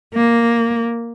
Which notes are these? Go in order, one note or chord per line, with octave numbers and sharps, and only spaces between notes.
A#3